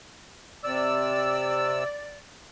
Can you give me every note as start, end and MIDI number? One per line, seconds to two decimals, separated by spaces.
0.64 1.84 48
0.64 2.19 74
0.64 1.84 88